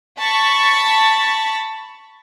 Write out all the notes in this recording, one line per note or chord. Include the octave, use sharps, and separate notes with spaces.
A5 B5 C#6